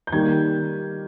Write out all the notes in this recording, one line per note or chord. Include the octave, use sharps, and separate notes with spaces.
G6
D#3 G3 A#3 G#6